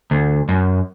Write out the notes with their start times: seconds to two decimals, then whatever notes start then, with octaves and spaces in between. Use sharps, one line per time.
0.11 D2
0.49 F#2